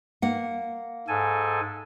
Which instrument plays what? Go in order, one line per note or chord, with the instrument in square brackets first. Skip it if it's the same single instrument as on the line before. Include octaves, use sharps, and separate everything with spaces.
[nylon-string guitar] A#3 F#5
[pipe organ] G#2 A4 G#5